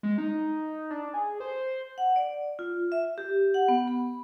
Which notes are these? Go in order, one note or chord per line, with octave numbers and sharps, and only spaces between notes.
G#3
D#4
D4
G#4
C5
F#5
D5
F4
E5
G4
F#5
B3
B5